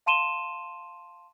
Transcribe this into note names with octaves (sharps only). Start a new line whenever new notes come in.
F5 A5 C6 D#7 E7 G7